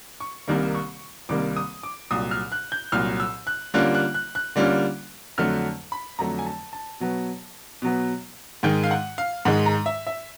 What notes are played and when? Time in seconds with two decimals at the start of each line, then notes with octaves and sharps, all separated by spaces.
0.20 C#6
0.48 C2 C3 D#3 G3 A#3
0.74 C#6
1.29 C2 C3 D#3 G3 A#3 D6
1.57 D#6
1.83 D6
2.11 C2 A#2 F#3 D#6
2.31 F6
2.52 F#6
2.72 G6
2.92 C2 A#2 F#3 F6
3.20 E6
3.47 F#6
3.74 D3 G3 A#3 C#4 F4 F#6
3.95 F#6
4.14 F#6
4.35 F#6
4.56 D3 G3 A#3 C#4 F4
5.38 F2 D3 F#3 A3 F6
5.92 B5
6.19 F2 D3 F#3 A3 A#5
6.39 G#5
6.46 A5
6.73 A5
7.00 B2 F#3 B3
7.82 B2 F#3 B3
8.63 G#2 D#3 G#3 G5
8.84 F5
8.91 F#5
9.18 F5
9.45 G#2 D#3 G#3 F#5
9.66 A#5
9.86 E5
10.07 E5